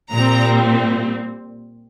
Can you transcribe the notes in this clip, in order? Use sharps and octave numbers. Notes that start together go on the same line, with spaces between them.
A#2 G3 C4 A#5